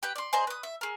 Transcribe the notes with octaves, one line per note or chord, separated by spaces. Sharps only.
G4 B4 G5
D5 C6
G#4 C5 D#5 A#5
B4 D#6
E5
G#4 A#4